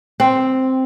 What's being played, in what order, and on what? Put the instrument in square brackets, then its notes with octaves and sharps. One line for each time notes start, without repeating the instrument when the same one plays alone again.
[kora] C4